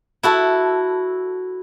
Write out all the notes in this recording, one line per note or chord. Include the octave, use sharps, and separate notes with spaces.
E4 F#4 A4